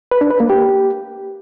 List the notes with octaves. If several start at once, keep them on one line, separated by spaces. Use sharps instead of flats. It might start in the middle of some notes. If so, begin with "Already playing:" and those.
B4
D4
B4
A#3
G4